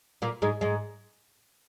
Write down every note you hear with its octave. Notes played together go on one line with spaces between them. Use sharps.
A#2 A#3
G#2 G#3
G#2 G#3